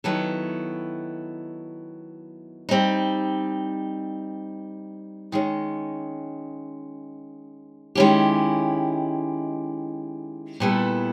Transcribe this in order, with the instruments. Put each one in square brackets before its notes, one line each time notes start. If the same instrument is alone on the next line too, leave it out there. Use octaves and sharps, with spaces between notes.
[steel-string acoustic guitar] D#3 F#3 B3 E4 A4
G3 C4 D#4
D#3 G#3 C#4
D#3 G#3 C#4 E4 G4
A#2 G3 B3 E4 A4